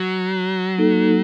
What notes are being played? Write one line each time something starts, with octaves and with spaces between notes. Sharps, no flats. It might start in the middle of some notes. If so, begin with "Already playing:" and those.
Already playing: F#3
A#3 D#4 A4